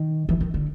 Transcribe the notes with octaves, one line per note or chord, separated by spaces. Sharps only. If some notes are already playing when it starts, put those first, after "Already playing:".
Already playing: D#3
E3
D#3
D3